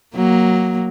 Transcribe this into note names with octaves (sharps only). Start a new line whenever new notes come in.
F#3 A#3